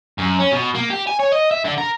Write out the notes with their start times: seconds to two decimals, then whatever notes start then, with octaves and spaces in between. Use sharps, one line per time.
0.19 F#2
0.40 C#4
0.53 B2
0.75 A#3
0.91 G4
1.07 G#5
1.20 C#5
1.32 D#5
1.51 E5
1.65 D3
1.78 A#4